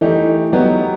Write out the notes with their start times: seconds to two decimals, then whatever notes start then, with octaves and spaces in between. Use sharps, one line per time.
0.01 E3 A3 D#4 G4
0.52 F#3 B3 D#4 G4